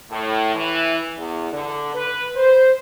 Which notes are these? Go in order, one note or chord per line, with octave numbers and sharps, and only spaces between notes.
A2
E3
E2
D3
B4
C5